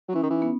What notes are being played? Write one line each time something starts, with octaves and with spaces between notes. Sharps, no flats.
F#3
E3 C#4
D#3 D#4
E3
B3